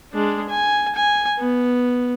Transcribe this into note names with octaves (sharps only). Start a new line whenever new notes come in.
G#3 D4
G#5
G#5
B3